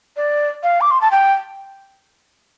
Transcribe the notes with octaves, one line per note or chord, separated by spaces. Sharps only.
D5
F5
D6
C6
A5
G5